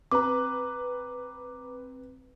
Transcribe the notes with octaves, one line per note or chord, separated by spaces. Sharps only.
C4 B4 A#5 D6